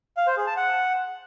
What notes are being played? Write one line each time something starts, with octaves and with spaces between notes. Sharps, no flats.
F5
C5
G#4
A5
F#5